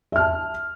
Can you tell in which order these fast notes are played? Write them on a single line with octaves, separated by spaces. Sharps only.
E5 F6 A5